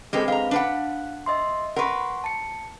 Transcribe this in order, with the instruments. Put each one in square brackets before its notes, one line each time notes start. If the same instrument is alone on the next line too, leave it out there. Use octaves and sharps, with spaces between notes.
[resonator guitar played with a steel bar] G#3 G4 A4 [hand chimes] C4 D4 B4
[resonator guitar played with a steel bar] G#3 A#5 [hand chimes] F5
[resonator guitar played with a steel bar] D4 B4 F#5
[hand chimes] D#5 E5 C6
[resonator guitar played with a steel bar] A#4 B4 [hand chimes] F#5 C6 C#6
[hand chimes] A5 C#7